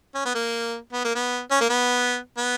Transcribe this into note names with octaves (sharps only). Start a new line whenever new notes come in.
C#4
B3
A#3
B3
A#3
B3
C#4
A#3
B3
B3